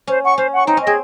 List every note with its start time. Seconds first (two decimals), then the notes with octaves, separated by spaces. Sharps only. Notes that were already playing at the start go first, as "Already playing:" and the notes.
0.07 C#4 C5
0.23 F#5 C#6
0.38 C#4 C5
0.52 F#5 C#6
0.67 C4 D#4
0.77 C#4
0.82 C4 G#4 D#5